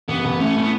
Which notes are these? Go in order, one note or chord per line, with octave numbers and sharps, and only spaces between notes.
A1 B3
A1
A3 C#4
A2
B3